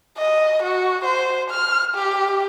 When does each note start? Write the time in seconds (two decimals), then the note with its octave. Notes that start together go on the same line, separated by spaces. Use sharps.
0.17 D#5
0.63 F#4
1.05 C5
1.51 F6
1.95 G4